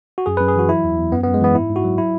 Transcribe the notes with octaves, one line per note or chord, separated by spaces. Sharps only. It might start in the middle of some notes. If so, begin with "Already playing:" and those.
F#4
F#2 G#4
F#2 B4
G#4
E3 F#4
F#3 E4
E2
E2
F#2 B3
F#2 B3
G#3
E3 B3
G#2 E4
G#2
F#4
F#3
E4